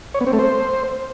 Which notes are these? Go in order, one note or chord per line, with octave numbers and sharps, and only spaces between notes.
C#5
B3
C4
A3
C5